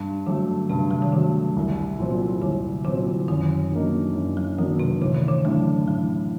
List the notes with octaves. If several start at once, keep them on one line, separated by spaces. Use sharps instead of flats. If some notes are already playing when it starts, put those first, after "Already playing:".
Already playing: G2
D3 F#3 A3
G2 C3
F#3
D#3
D3 F#3 A3
C2
A#2 F#3 C4
C2 D3
A#2 D3 F#3 C4
F#2 D#3
D3 F#3 A#3 D#4
F#2 F#3
F#3
D3 D#3 F#3 A#3 D#4
C3
A1 D3
D#3
D3
A2 F#3 A3 D4
A1 F#3